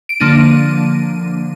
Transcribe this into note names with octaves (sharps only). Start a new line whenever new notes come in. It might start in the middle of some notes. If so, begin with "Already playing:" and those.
D7
D3 F3 A#3 D4 D#7